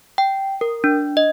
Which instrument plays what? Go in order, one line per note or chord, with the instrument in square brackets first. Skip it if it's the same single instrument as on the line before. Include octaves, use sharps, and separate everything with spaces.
[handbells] G5
A#4
D4
D#5